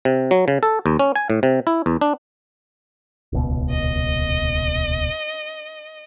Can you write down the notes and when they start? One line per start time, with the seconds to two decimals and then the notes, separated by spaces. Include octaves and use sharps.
0.05 C3
0.31 F#3
0.48 C#3
0.63 A4
0.86 D#2
0.99 C#4
1.16 G#5
1.30 A2
1.43 C3
1.67 E4
1.86 E2
2.01 D4
3.33 D#1 C#2 B2
3.70 D#5